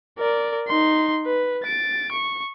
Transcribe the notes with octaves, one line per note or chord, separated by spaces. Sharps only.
A#4 D5
D#4 C6
B4
A6 D7
C#6